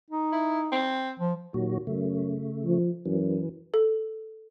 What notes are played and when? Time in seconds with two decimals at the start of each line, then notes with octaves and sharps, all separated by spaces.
0.10 D#4
0.32 E4
0.72 C4
1.20 F3
1.54 D#2 A#2 F#3 F#4
1.87 F#2 C#3 A3
2.65 F3
3.06 F#2 E3
3.74 A4